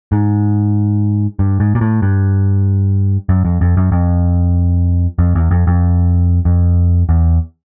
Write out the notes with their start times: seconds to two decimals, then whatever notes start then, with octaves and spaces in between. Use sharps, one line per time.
0.12 G#2
1.39 G2
1.60 G#2
1.75 A#2
1.81 A2
2.02 G2
3.29 F#2
3.45 F2
3.61 F2
3.77 F#2
3.92 F2
5.19 F2
5.35 E2
5.51 F2
5.67 F2
6.45 F2
7.09 E2